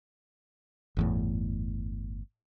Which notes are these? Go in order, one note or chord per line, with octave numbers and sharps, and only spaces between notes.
G1 E2 A2